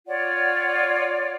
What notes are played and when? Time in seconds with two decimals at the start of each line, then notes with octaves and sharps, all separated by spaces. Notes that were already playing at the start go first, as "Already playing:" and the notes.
0.07 F4 C#5 D5 F#5